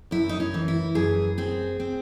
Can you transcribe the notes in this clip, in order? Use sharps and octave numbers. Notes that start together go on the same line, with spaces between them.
F#2 E4
D#4
C#4
E3
E4
F#2 G#4
C4 G#4
C4